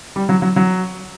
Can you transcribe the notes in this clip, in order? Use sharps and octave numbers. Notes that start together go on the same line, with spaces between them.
G3
F#3
F#3
F#3